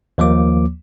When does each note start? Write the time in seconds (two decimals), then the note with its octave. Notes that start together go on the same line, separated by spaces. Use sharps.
0.18 D#2 F3 A#3 D6